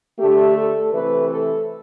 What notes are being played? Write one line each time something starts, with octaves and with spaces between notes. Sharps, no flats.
D3 A3 G4
A4
C3 E3 A3 B4
A4